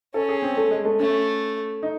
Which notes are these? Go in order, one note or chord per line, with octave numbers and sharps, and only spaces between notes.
C#4 A4
G#4
C4
A3
G#3
A3
A3 C#4
D#4